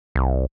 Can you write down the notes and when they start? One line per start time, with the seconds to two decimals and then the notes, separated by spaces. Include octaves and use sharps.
0.16 C2